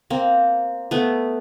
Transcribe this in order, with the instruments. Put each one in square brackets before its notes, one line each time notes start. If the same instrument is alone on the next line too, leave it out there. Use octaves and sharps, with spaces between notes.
[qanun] A#3 C4
A3 B3